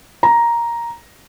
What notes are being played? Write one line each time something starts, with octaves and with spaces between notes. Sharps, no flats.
A#5